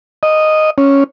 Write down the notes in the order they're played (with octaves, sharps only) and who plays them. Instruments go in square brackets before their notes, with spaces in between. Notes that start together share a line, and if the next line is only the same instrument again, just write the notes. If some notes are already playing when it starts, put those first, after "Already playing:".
[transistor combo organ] D#5
C#4